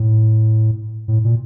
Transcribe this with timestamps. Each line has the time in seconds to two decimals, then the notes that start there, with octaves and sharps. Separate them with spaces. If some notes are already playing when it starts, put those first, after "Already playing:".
Already playing: A2
1.08 A2
1.24 A#2